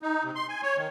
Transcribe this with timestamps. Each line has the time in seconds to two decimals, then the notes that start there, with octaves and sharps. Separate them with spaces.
0.02 D#4
0.24 C3
0.35 C6
0.49 G#5
0.63 C#5
0.77 D#3